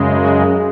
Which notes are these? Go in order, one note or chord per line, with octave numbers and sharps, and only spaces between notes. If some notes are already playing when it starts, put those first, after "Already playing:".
Already playing: F#2 C#3 G#3
F#4